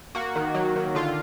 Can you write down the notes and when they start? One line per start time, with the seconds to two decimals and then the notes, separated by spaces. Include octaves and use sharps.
0.15 A#3 F#4
0.35 D#3
0.55 F#3
0.76 D#3
0.95 D3 F4